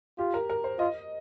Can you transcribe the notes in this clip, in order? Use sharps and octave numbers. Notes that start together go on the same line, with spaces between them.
F4 G4
A#4
A#4
C5
F4 D#5